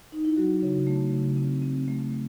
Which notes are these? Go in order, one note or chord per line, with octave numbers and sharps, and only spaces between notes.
D#4
E4
F#3 F#4
C#3
A3
C#3
C4
C4
A3